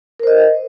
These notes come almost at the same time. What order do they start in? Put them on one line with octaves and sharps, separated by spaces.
A#4 C5 D#5